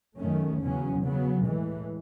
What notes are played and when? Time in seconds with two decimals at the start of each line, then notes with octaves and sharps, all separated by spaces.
0.18 F#2 D#3 A3 C#4
0.60 E2 C#3 F#3 C#4
1.02 C#3 F#3 B3
1.44 A2 E3 G#3